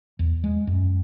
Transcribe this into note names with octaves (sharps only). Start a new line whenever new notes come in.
E2
G#3
F#2